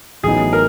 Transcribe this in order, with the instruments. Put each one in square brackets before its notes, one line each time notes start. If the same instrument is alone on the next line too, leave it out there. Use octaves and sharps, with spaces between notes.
[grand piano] A1 A2 F#3 B3 D#4 [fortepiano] G#4
[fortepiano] A#4